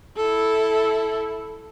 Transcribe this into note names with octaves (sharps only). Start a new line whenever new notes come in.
E4 A4